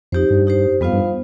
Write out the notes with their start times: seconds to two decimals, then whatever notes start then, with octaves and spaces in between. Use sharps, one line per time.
0.12 F2 D#4 G4 C5
0.30 G2
0.47 D#4 G4 C5
0.81 F2 G3 B3 F4 C5 F5
0.93 G2